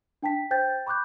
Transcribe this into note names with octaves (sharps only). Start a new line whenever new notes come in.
D4 G5 A5 B6
C5 G5 G6 A6
B5 C#6 D6 F#6 G6